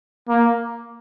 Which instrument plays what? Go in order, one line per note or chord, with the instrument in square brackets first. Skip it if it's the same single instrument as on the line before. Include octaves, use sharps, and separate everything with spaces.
[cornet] A#3